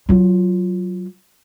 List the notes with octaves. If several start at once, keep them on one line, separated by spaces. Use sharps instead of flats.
F#3 F4